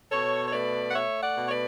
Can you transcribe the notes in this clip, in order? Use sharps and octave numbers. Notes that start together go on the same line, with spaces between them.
B2 A4 C#5
C#5
A3 B4 D5
F#5
A3 C#5 E5
D5 F#5
B2
C#5
B4 D5